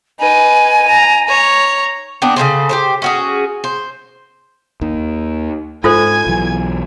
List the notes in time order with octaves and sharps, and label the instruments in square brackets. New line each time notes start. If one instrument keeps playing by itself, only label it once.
[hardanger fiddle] D#4 B4 [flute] G#5
[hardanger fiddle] A#5
C#5 A#5
[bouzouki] B3 C4 D4
C#3 G3 A4 C5
G4 A#4 C5
C#4 F#4 G#4
C5
[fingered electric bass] D#2 D#3
[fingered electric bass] G#2 [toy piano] F4 A4 C5 [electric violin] G#5 G#6
[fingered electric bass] B1 E3 F#3